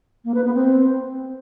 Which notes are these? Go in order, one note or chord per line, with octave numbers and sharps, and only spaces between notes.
A#3
B4
B3
C4